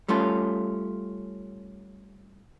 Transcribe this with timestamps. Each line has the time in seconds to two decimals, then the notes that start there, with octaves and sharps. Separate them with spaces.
0.08 G3 A3 C#4 F4